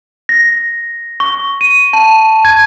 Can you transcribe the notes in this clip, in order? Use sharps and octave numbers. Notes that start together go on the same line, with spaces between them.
A#6
C#6
D#7
A5
G#6